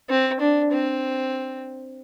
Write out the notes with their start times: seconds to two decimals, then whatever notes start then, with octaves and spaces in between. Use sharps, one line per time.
0.10 C4
0.40 D4
0.72 C4